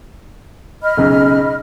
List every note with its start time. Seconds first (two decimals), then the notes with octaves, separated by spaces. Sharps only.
0.83 D#5 B5 F6
0.97 B1 C#3